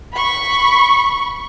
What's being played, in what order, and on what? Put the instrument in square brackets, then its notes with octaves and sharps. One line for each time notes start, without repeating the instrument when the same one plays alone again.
[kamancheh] B5 C#6